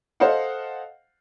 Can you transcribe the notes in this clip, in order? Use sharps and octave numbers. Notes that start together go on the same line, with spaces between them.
A4 C5 D#5 F5 F#5